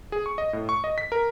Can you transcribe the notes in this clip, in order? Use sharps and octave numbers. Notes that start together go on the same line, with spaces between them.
G#4
C#6
D#5
A2
C#6
D#5
B6
A#4